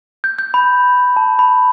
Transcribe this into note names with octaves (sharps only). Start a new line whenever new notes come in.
G6
G6
B5
A5
B5